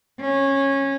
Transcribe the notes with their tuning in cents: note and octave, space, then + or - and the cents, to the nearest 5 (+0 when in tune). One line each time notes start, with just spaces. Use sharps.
C#4 -15